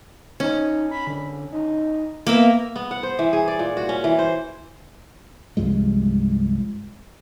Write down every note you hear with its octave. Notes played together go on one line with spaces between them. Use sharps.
C#4 D#4
B5
D3
D#4
A#3 B3 A#4 E5
B3
F#5
C5
E3
G#4
D5
A#2
F#4
C#4
E3
C5
C2 G2 F3 G#3